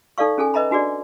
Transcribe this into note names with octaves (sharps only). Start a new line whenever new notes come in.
D#4 A4 D5 F5 C#6
C#4 G#4 A4 G#5
B4 D#5 E5 A#5 B5
D4 F#4 G#4 D5